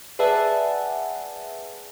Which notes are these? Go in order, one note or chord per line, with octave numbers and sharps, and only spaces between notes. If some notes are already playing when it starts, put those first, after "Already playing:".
G#4 B4 D5 E5 F#5 A5